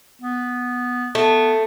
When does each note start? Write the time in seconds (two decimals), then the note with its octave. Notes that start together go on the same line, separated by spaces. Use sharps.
0.22 B3
1.15 A3 B3